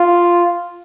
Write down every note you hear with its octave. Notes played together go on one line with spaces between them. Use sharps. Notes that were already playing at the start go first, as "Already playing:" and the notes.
Already playing: F4